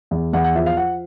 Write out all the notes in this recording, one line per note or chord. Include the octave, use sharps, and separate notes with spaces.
E2
E2 F#5
F#5
F3 E5
F5
F3 F#5